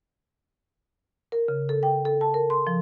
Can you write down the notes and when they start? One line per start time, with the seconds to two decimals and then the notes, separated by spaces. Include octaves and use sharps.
1.32 A#4
1.48 C#3
1.69 A4
1.83 G5
2.05 A4
2.21 A5
2.34 A#4
2.50 C6
2.67 F3